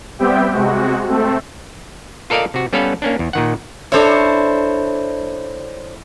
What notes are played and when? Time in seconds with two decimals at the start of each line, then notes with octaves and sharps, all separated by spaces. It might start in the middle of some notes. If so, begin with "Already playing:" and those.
0.19 G3 B3 C4 G4 E5 G5
0.52 C3 G#3 F#4
1.08 A3 C4 A4
2.30 F4 A4 A#4 D5 D#5 F5
2.54 C3 F#4
2.73 G3 B3 C#4 A4 B4 F5
3.02 A#3 C#4 D4
3.19 E2
3.33 A#2 D#3 F#5
3.92 D4 E4 A4 C5 C#5